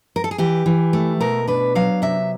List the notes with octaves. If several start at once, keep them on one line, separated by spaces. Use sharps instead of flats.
A#4
A4
G#4
E3 G4
E3
A3
B2 A#4
D4 B4
F#3 F5
C3 E5